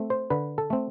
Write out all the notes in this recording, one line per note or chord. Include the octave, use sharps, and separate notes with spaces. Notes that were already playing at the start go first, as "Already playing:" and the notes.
Already playing: A3 C4
C5
D3 B4
A4
A3 C4